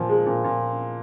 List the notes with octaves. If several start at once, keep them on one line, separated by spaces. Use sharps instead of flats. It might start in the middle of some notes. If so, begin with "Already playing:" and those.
Already playing: A#2 F3
G#3
A#2
A#2